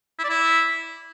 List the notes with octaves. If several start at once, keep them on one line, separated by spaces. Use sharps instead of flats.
E4
D5
E4